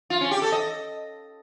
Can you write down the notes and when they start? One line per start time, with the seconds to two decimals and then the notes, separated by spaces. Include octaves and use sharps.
0.10 F4
0.21 C#4
0.31 G4
0.42 A4
0.52 D#5